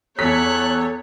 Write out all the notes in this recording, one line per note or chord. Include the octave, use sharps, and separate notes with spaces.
E2 A4 C#5 F#6 B6